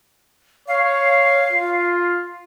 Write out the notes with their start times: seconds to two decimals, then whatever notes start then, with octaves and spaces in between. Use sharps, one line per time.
0.68 C#5 F5
1.50 F4